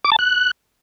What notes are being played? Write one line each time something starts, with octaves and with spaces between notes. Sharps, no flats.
D6
A5
F#6